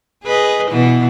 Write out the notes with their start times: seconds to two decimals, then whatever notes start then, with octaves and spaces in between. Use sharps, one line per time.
0.24 G#4 B4 D#5
0.70 B2 E3 B3